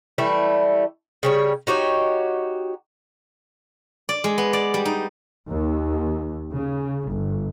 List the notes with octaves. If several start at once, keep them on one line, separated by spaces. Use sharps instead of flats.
E3 G3 A3 E4
C#3 G3 C#5
D#4 F#4 G4 C#5
D5
G#3
B3
D5
G3
D#4
D#2
C#3
G1